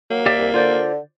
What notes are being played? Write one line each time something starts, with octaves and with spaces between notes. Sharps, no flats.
F#3 A#3
D#2 G4 D5 E5
C2
D3 F4 C5 D5